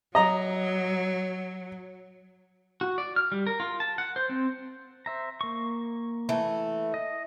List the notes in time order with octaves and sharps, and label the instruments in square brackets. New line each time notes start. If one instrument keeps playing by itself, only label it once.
[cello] F#3 [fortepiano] D#5 A#5
[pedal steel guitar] F#4
D5
F6
G3
A#4
F4
A5
F#5
C5
C4
C5 E5 A#5
A#3 C#6
[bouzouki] E3 A3
[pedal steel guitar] D#5